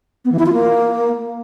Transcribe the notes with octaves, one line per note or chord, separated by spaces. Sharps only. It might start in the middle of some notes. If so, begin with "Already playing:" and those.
B3
E3
E4
F4
A#3